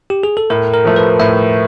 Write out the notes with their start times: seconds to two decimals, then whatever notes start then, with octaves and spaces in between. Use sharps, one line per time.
0.10 G4
0.23 G#4
0.37 A4
0.50 A2 A#4
0.74 A#4
0.85 F3 A3
0.96 B4
1.20 A2 E5